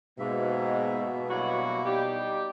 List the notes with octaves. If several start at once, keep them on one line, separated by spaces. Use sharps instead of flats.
G#2 B2 A#3 E5
G2 F#3 A#3 E4 F#4
G3 D#4 G4